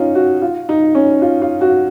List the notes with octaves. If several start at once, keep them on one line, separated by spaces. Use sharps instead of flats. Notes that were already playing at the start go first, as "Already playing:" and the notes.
Already playing: C#4 D#4 F4
F#4
F4
D#4
C#4
F4
F4
F#4